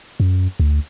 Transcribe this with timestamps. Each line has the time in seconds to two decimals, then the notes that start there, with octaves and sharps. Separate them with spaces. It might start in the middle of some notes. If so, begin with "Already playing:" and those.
0.20 F#2
0.60 D2